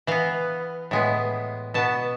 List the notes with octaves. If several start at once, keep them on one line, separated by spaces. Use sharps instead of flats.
E3 B3 F5
A2 G#3 B3
B2 B3 A5